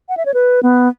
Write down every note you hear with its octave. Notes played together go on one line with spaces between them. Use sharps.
F#5
E5
C#5
B4
B3